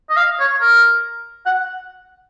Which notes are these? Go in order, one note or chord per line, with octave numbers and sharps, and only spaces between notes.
D#5
F5
C#5
A#4
F#5